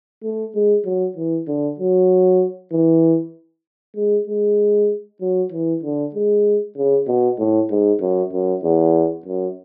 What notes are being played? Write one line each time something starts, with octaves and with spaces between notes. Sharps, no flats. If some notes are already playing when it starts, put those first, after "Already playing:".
A3
G#3
F#3
E3
D3
F#3
E3
G#3
G#3
F#3
E3
D3
G#3
C#3
B2
A2
G#2
F#2
F#2
E2
F#2